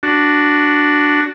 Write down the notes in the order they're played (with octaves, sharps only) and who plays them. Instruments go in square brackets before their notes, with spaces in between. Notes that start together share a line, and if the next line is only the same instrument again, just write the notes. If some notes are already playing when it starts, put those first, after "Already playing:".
[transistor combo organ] D4 F#4